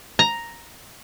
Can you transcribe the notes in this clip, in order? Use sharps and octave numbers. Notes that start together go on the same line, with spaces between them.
A#5